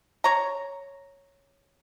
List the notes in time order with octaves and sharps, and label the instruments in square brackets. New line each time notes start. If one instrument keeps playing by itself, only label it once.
[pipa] C#5 A#5